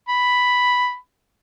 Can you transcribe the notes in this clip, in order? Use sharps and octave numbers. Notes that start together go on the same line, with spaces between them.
B5